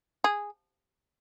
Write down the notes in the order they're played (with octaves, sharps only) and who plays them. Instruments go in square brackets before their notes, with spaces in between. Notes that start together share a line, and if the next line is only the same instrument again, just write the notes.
[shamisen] G#4